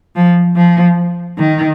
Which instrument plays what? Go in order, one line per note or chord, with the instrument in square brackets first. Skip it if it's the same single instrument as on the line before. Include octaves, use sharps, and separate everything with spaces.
[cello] F3
F3
D#3